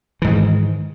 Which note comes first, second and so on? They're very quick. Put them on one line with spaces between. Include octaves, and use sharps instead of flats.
E3 G#2 D#3